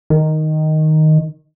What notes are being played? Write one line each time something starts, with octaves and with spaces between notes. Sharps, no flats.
D#3